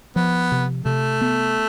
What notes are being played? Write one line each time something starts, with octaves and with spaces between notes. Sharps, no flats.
F3 B3
C3
C3 A3
B3